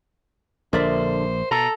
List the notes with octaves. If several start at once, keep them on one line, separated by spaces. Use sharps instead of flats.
A#1 D3 A#4 C5 D5 E5
B2 A4 A#5